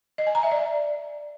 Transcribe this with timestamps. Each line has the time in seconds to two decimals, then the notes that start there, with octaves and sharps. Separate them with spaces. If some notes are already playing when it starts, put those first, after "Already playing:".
0.18 D#5
0.27 G#5
0.35 A#5
0.43 E5
0.52 D5